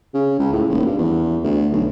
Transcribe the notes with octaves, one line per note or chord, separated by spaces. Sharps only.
C#3
C#2
A2
D#1
G2
E2
D2
B1